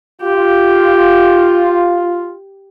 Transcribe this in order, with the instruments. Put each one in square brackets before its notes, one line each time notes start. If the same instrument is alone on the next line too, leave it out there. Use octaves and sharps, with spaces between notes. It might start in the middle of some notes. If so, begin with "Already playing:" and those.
[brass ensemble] F4 [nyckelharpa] G4